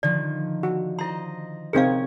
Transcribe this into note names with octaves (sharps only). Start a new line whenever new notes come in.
D3 D#3 F3 D5
F#4
E4 C5 D#5 A#5 C6
C3 C4 C#4 D#4 G#4 A#4 F5 G#6